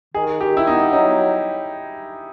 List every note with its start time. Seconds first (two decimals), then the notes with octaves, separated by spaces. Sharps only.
0.15 D#3 G#4
0.41 D#3 G4
0.57 E4
0.67 B3 D#4
0.93 F#3 D#4